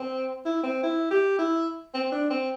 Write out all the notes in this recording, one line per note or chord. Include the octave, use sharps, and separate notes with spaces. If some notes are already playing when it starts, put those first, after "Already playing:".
Already playing: C4
E4
C4
E4
G4
E4
C4
D4
C4